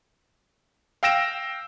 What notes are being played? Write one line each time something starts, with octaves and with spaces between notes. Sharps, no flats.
F5 G5 E6 A#6 D7 E7